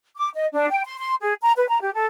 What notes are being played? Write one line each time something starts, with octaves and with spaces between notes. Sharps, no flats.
D6
D#5
D4
G5
C6
C6
G#4
A#5
B4
A#5
G4
A4